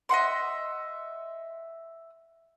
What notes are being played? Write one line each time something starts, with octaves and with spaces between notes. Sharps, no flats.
D#5 E5 F#5 C6